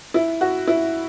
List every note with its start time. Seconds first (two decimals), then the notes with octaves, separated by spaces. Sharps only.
0.14 E4
0.41 F#4
0.67 E4